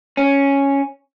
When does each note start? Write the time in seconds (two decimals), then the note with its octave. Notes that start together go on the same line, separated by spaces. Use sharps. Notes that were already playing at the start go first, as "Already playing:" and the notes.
0.17 C#4